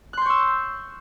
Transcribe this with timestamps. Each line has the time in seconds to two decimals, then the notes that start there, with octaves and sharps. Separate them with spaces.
0.13 F#6
0.17 C6
0.22 G6
0.26 C#6
0.30 E6